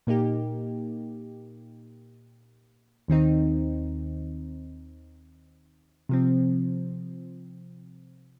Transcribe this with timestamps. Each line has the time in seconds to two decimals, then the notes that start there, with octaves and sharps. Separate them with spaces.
0.07 A#2 A#3 D#4 G4
3.08 D#2 D#3 C4 D#4
6.09 C3 F3 C4